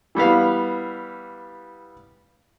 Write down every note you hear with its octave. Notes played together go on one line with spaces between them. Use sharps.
E3 G3 B3 F5